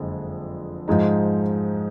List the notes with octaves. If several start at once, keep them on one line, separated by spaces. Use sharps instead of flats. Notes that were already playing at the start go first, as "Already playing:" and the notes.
Already playing: F#1 F2 D3 G#3
G#2 F3 G#3 D#4